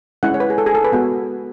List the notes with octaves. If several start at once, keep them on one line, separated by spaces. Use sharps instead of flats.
G#3 C#4 E4 F#5
C#5
B4
G#4
A4
G#4
A4
B4
G#3 B3 F#4